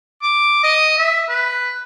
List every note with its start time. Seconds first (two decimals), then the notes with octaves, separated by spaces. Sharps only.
0.23 D6
0.64 D#5
0.98 E5
1.29 B4